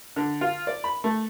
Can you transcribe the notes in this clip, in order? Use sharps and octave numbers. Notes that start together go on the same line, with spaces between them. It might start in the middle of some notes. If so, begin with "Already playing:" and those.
D3
F4
D5
B5
A3